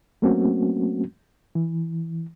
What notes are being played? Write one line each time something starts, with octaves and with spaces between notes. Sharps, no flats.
F#3 A3 A#3 C4 C#4 F#4
E3